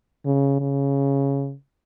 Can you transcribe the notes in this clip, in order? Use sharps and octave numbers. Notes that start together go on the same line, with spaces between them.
C#3
C#3